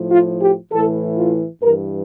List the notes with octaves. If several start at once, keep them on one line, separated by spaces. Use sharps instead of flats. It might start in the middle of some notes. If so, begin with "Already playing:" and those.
Already playing: A2 F3
F4
G4
A2 E3 A4
F4
G2 E3 A#4